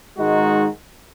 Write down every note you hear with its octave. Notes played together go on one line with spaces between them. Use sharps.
G#2 D#3 G#3 D#4 F#4